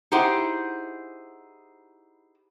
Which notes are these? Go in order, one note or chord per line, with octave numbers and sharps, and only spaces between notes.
D#4 E4 G4 G#4 C5 F#5